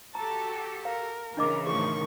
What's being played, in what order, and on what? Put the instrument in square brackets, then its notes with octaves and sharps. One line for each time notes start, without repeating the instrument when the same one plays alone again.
[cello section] F#4 G4 A4 [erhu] A5 [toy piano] A#5
[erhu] A#4 [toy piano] F5
[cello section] C#3 E3 [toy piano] D4 D#5 D6 [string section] A#4 A#5
[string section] A2 D#3 F3 [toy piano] G#4 [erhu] C#6